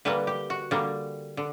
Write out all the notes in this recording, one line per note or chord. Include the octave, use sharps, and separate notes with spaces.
D3 G3 A#3 B4
G4
F#4
D3 G3 A#3
D3